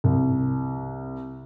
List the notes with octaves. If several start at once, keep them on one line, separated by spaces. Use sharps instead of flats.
C2